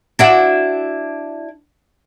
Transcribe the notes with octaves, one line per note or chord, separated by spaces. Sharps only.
D4 E4 F#4